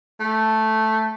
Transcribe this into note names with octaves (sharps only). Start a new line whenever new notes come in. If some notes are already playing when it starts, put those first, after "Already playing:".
A3